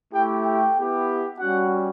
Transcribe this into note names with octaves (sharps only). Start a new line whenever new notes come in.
A3 E4 G4 G5
G5
B3 E4 G4
G3 C#4 F#4 F#5